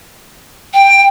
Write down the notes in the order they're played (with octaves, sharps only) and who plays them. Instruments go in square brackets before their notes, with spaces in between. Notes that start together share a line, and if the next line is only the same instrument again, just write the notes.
[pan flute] G5